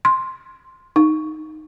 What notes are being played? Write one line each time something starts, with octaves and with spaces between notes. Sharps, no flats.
C6
D#4